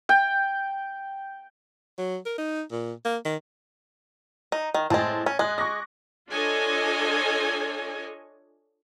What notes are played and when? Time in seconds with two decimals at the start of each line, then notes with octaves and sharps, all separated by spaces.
0.09 G5
1.98 F#3
2.26 A#4
2.38 D#4
2.72 A#2
3.05 A#3
3.25 D#3
4.52 D#4
4.74 D#3
4.90 A2 G#3 C4 A5 A6
5.26 C#4
5.39 G#3 D#6 F#6
5.58 C#6 D6 A#6
6.31 D4 F4 A4 C#5 D#5 G#5